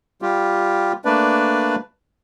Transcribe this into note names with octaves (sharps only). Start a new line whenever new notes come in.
G3 F4 G4
A3 A#3 D4 B4 D5